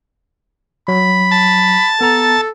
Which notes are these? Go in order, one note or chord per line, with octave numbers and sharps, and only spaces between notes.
F#3 B5
A5
B3 A4 A#5